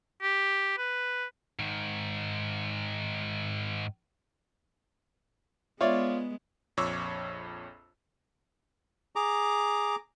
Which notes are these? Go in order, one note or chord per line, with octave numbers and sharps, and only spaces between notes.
G4
B4
G#2 D#3
G#3 B3 F4 C#5 D5 E5
A#1 F2 C#5 C#6 D6 E6
G#4 A#5 D6